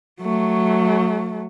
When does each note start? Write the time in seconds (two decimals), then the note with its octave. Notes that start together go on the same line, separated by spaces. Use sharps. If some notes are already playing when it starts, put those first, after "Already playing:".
0.21 F#3 A3